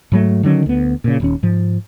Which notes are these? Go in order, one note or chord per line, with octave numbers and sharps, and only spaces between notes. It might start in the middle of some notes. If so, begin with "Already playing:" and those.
G#2 F#3 A3
D3 D#3 F#3 C#4
D2 B3
A#2 C#3
D#1 D#2 C#4
G#2 F3